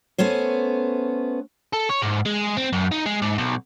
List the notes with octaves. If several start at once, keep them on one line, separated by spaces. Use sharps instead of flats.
A3 B3 C#4 C5
A4
C#5
G#2
G#3
C4
F#2
D#4
G#3
G#2
B1